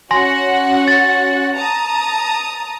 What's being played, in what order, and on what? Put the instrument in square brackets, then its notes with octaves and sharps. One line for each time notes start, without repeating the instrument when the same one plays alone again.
[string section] C#4 F#4 F#5 [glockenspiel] G#5 C6 A#6
[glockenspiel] A6
[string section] A5 A#5 D#6